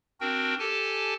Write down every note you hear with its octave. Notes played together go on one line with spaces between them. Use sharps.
C4 D4 F#4 A#4 G5
G4 A4 G#5 A5